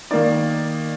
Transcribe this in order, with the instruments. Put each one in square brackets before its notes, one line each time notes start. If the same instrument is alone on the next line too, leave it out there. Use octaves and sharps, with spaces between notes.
[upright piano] D#3 A#3 D#4 D5